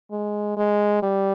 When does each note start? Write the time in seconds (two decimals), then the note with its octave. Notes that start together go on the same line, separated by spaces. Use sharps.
0.11 G#3
0.57 G#3
1.03 G3